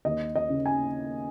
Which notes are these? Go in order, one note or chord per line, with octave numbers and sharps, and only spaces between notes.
D#2 D#5
D#5
C#3
G#5